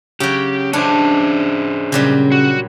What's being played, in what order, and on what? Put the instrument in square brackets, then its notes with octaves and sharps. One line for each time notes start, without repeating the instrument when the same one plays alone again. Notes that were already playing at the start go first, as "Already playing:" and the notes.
[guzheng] C#3 F#3 [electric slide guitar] G4
[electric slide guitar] C#4 G#4 C5 [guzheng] D4
[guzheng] A#2 F#3 G3 [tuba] C#3
[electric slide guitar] F#4